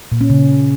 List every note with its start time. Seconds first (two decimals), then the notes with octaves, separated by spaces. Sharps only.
0.12 A#2
0.21 C#4
0.30 C#3